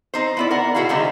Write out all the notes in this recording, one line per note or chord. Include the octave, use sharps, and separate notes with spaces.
C4 D#4 C5
B3 E4 D5
A#4 F#5
B2 B3 E4 F#4 G#4 F5
C3 D#3 G3 G#3